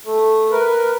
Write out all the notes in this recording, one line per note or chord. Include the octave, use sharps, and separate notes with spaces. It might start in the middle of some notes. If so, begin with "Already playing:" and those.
A3
A#4 B4